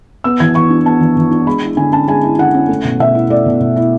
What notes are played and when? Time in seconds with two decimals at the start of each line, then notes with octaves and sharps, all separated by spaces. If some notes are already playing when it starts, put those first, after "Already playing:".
0.24 B3 E6
0.40 E3 G#6
0.55 E3 C#6
0.70 D4
0.86 B3 A5
1.00 E3
1.17 E3
1.31 D4
1.47 G#3 B5
1.63 E4
1.77 D3 G#5
1.92 C#4 A5
2.08 G#3 G#5
2.23 E4
2.39 D3 F#5
2.54 C#4
2.69 A3
2.84 B2
2.99 B2 E5
3.15 E4
3.30 A3 D5
3.46 B2
3.60 B2
3.76 E4